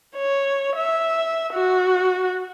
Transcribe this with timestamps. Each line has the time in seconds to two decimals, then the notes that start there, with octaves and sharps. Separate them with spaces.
0.16 C#5
0.76 E5
1.53 F#4